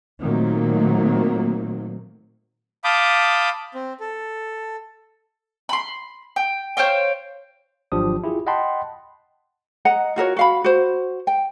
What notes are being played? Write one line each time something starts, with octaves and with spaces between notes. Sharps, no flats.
A#2 D#3 F#3 A3 A#3 C4
F5 A5 B5 D6 D#6 G6
C4
A4
B5 C6
G5
C5 C#5 F5 G5
G#1 F3 F#3 D4 G4 D#6
E4 F4 G4 G#4
D#5 F#5 G5 A5 B5 C6
D#5 F#5 A#5
F4 F#4 A#4 C#5
F#4 F5 B5
F#4 C5
G5